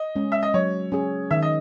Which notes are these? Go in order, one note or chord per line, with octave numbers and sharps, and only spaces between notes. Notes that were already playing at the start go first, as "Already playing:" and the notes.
Already playing: D#5
G#3 C#4
E5
D#5
F#3 C#5
C#4 G#4
D#3 E5
D#5